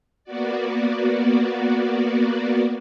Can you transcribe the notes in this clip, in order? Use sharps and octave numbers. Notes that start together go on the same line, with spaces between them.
A#3 B3 F#4 D5